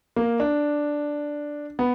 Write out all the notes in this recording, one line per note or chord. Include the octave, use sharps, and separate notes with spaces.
A#3
D4
B3